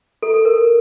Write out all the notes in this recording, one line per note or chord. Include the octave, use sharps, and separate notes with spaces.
A4
A4
A#4